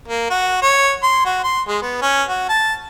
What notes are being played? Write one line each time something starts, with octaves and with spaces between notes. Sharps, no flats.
A#3
F#4
C#5
C6
F#4
C6
G#3
B3
C#4
F#4
A5